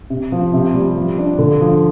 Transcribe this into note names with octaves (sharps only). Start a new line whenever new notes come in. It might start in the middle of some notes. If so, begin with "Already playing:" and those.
C3
F3
C3
G3
F3
D4
D3
F3